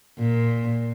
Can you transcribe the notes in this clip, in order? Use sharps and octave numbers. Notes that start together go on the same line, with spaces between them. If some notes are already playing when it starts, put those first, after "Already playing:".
A#2